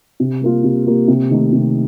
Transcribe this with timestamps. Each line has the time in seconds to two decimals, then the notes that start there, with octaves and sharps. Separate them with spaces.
0.20 C3
0.41 G3 A#3 F4
0.64 C3
0.86 G3 A#3 F4
1.08 C3
1.30 D#3 A3 D#4
1.53 C3